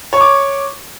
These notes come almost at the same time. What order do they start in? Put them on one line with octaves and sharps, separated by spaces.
C#5 C#6 D6